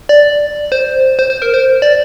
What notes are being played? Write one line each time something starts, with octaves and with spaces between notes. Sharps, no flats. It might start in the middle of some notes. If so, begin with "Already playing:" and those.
D5
C5
C5
C5
A#4
C5
D5